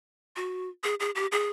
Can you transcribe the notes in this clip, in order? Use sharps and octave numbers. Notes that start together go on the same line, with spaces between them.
F#4
G#4
G#4
G4
G#4